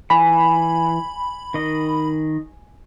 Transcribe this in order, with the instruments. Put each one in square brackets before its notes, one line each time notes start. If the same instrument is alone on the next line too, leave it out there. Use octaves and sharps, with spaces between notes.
[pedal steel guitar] E3 [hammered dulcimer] G#5 [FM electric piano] B5
[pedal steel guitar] D#3 D#5